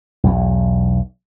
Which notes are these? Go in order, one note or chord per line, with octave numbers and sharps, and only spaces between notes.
B1 E2